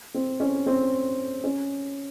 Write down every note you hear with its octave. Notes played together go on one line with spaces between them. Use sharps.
C4
C#4
C4
C#4